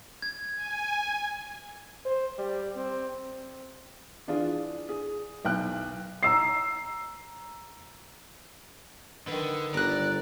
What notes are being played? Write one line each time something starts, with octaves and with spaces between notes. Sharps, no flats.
G#6
G#5
C5
G3
C4
E3 D4 F4 G#4
G#4
B1 G5 F#6
A#5 E6 C7
D3 D#3 B4
G1 D5 A#5 F#6